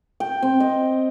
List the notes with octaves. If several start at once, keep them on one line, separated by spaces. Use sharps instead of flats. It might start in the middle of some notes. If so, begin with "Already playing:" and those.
G5
C4
D#5